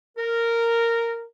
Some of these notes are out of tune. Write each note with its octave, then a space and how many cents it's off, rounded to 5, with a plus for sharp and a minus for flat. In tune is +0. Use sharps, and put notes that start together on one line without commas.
A#4 -10